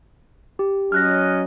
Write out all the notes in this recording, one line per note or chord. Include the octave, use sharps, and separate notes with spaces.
G4
F#3 C#4 D#5 F6 F#6 A#6